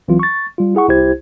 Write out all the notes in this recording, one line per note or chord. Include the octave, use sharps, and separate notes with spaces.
B1 E3 F#3 C4 F4
C#6 A6
G3 F4
E4 G#4 F#5 C#6
C2 E4 G4 C5 G#6